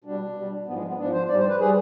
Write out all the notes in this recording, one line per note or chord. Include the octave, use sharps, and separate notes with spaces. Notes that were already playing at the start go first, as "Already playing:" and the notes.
B2 G3 D4
B2 G3
G#2 F3 B3
G#3
B3
G#2 F3 D4
C5
G#2 G3 D5
C5
B4
G3 G#4